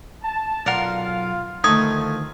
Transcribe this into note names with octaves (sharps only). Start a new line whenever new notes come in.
A5
B1 F4 A#4 D5 F5 F#5 C6
D2 D#3 F3 A3 D#4 D#6 G#6